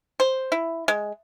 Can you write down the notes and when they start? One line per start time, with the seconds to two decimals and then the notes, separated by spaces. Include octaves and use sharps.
0.20 C5
0.52 E4
0.88 G#3